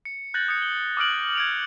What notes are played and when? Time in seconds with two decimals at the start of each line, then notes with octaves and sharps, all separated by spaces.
0.05 C#7
0.34 F#6 G6 A6 A#6 F#7
0.48 D#6 G#6 C#7
0.62 G7
0.97 D6 D#6 F6 F#6 D7 F#7
1.35 G#6 D7 F7